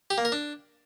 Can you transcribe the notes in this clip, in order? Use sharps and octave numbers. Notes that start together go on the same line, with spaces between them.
G4
A#3
A#4
D4